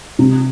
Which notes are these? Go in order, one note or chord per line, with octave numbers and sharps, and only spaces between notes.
C3